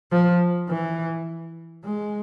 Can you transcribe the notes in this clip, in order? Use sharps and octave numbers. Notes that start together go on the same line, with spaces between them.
F3
E3
G#3